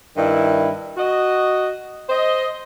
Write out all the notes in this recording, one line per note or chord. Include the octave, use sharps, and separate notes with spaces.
G2 D#3 E4
F#4 D#5
C5 D#5